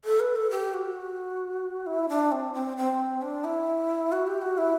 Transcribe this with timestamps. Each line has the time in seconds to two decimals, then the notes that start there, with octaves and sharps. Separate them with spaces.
0.05 A4
0.20 B4
0.36 A4
0.51 G4
0.74 F#4
1.86 E4
2.09 D4
2.32 C4
2.54 C4
2.77 C4
3.22 D4
3.44 E4
4.12 F#4
4.27 G4
4.42 F#4
4.58 E4